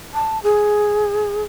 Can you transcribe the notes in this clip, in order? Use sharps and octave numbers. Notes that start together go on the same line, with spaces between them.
A5
G#4